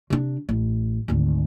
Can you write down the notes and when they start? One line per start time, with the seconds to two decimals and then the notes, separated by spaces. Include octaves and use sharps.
0.10 C3 D4
0.49 A1
1.08 G#1 D2